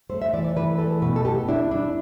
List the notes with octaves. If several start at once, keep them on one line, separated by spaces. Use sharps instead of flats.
A3 C5
E5
E3 D5
D5
E3 B4
A3 A4
B2 B4
A4
B3 G4
D4 E4
D4